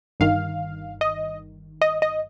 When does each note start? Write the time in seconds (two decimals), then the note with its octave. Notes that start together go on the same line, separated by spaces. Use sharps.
0.20 G1 G2 D#3 F5
1.01 D#5
1.82 D#5
2.02 D#5